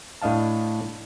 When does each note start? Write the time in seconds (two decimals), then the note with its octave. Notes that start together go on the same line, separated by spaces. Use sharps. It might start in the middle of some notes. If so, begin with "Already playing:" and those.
0.22 A2 D4 D#5 F5 A5